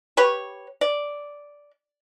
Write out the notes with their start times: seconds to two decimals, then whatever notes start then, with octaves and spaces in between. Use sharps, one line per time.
0.17 G4 B4 C#5
0.81 D5